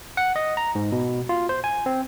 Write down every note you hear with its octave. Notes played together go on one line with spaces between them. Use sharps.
F#5
D#5
A#5
G#2
B2
F4
C5
G#5
C4